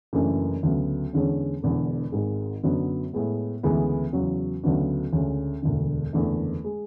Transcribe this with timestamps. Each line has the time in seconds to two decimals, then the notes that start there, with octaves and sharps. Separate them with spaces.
0.13 F#1 F#2 E3 A3 D4
0.63 D2 C#3 F#3 B3
1.13 E2 D3 G#3 C#4
1.63 E1 E2 D3
2.12 G#1 G#2 G#3
2.63 F#2 D3 F#3 B3
3.13 A2 G#3 B3
3.63 D2 C#3 E3 G#3 B3
4.13 E2 C#3 F#3
4.63 D2 C#3 F#3 B3 D4
5.12 D2 C#3 G#3 C#4
5.62 E1 D2 D3
6.13 F#1 E2 D3 A3
6.64 G#3